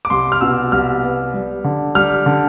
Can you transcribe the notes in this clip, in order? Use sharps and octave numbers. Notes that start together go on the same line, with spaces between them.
D6
C2 C6
F6
B2 E6
C2 F6
B3
G3
D3
G3 F6
D3